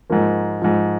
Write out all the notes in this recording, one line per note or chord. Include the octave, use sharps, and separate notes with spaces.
G#2 F3 A#3
G#2 F3